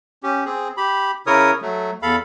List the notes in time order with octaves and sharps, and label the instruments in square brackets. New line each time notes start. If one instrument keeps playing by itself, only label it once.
[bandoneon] C#4 G4
C4 G#4
G4 B5
C#3 E4 A#4 C#5 D#6
F#3 A3
E2 A4 F5 B5